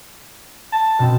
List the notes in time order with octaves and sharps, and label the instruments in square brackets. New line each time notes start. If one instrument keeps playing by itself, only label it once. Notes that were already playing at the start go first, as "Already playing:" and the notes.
[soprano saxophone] A5
[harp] B2 C4